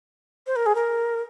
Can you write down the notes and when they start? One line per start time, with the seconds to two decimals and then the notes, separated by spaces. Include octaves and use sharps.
0.47 C5
0.56 A#4
0.66 G#4
0.75 A#4